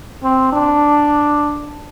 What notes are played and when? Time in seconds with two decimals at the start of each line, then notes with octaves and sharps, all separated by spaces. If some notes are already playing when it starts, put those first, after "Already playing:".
0.23 C4
0.52 D4